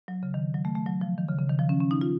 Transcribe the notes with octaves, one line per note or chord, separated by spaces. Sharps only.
F#3
C#3
D#3
F#3
A3
A3
F#3
F3
D#3
C#3
C#3
D#3
F3
C#4
C#4
D#4
F4